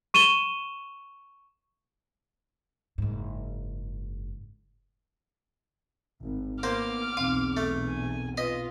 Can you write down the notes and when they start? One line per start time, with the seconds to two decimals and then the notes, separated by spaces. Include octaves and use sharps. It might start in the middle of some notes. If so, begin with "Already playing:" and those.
0.14 C#6 D#7 E7 G7
2.98 F#1 G#2
6.21 G#1
6.63 A#3 B3 C5 D6 F6
7.17 B1 E2 C4 F5
7.57 A3
7.88 G#5
8.38 F4 B4 D#5